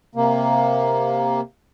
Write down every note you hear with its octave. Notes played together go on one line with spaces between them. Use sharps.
C3 A#3